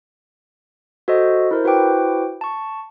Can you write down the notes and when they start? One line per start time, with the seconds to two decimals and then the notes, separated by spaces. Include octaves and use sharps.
1.08 F#4 A4 C5 D#5
1.51 E4 A#4 C5
1.64 E4 F#4 B4 C5 G5 D6
2.41 A5 C#6